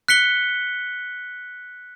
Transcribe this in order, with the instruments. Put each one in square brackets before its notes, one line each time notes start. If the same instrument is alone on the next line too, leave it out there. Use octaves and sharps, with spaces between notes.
[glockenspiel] F#6 B6 C#7 G7